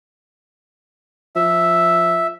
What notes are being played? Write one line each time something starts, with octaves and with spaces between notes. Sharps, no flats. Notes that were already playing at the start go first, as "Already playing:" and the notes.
F3 E5